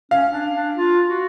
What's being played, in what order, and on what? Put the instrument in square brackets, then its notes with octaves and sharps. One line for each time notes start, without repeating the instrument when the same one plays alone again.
[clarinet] C#4 [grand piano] F5
[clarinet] D4
D4
F4
F#4